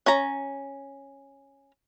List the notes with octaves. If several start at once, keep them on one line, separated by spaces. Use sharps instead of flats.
C#4 A#5